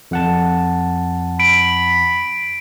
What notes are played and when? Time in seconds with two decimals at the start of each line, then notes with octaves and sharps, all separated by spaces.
0.11 F2 F#5 A5
1.40 B5 D7